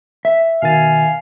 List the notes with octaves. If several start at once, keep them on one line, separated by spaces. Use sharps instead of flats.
E5
B2 D#3 F5 G#5 A6